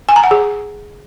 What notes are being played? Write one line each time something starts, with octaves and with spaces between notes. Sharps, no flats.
G#5
A#5
F#5
G#4